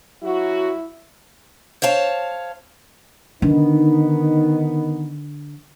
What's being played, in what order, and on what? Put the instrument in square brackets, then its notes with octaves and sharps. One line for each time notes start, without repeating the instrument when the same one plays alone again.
[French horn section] F#3 F#4 [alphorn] E4
[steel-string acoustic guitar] C5 C#5 F5 A5
[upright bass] D3 [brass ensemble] D#3 B3 D#4